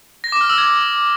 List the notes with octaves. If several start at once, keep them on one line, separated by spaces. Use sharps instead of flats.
A#6
D6
F6
E6
G#6